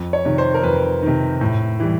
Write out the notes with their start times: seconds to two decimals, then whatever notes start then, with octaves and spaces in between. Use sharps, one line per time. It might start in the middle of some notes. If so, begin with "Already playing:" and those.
Already playing: F2
0.13 C#5
0.25 C3 D#3
0.38 C5
0.54 A#4
0.63 F2 B4
1.03 C3 D#3
1.41 A2
1.80 E3 G3